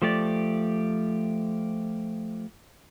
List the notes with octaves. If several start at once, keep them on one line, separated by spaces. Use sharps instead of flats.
F3 A3 G4 D5